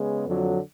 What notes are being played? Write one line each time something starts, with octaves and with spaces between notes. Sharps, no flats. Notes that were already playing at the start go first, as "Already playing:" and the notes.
Already playing: C#3 G#3 B3
F2 D3 F#3